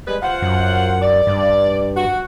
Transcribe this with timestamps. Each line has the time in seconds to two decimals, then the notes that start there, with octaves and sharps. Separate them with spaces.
0.07 G3 G#3 B4
0.23 F4 C5 F#5
0.42 F#2
1.02 D5
1.27 G2
1.96 F#4